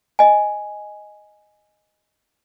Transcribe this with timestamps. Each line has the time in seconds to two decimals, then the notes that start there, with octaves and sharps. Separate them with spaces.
0.19 D#5 G#5